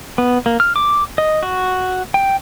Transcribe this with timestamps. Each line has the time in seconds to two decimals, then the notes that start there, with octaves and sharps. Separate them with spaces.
0.18 B3
0.46 A#3
0.60 F6
0.76 D6
1.18 D#5
1.43 F#4
2.14 G5